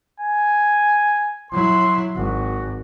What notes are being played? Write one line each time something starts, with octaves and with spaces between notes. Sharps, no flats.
G#5
F#3 E4 C6
G#1 F#4